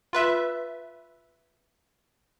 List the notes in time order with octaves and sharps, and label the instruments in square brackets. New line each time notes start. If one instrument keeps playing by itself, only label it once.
[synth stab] F4 B4 E5